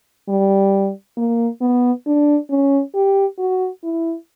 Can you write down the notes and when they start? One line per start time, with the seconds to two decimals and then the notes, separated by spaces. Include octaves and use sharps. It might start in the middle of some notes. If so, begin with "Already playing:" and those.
0.29 G3
1.17 A#3
1.61 B3
2.06 D4
2.50 C#4
2.95 G4
3.38 F#4
3.83 E4